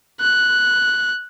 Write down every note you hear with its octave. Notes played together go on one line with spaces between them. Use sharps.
F#6